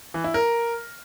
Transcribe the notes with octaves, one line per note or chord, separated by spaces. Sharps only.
E3
E4
A#4